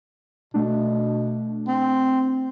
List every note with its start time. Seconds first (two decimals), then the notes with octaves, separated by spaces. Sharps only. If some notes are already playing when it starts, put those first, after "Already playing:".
0.54 B2 A3 D4
1.68 C4